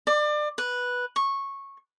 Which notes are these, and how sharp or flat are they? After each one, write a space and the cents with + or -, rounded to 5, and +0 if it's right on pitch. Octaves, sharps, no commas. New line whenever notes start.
D5 +30
B4 -5
C#6 -15